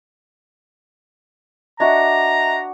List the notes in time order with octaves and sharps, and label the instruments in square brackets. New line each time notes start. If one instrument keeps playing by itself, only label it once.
[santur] D4 F#4 [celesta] D#5 E5 [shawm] A#5